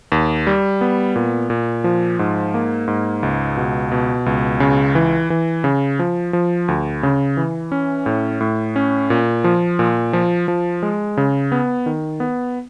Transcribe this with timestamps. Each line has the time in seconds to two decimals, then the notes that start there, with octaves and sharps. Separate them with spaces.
0.12 D#2
0.47 G3
0.81 B3
1.15 A#2
1.50 A#2
1.84 F3
2.19 G#2
2.54 A#3
2.88 G#2
3.23 C#2
3.57 B2
3.92 B2
4.26 C#2
4.60 C#3
4.95 E3
5.30 E3
5.64 C#3
5.99 F3
6.33 F3
6.68 D2
7.03 C#3
7.37 E3
7.72 C#4
8.06 A2
8.41 A2
8.76 C#4
9.10 A#2
9.44 F3
9.79 A#2
10.13 F3
10.48 F3
10.83 G#3
11.17 C#3
11.52 B3
11.86 D#3
12.20 B3